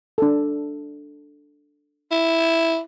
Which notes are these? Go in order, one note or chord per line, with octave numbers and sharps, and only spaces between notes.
D4 A4
E4